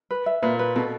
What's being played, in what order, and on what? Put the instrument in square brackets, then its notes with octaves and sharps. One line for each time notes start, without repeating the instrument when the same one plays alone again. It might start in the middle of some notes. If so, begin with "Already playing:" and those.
[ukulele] B4
E5
[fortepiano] A#2 [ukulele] B4
[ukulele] B4
[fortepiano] B2 [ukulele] A4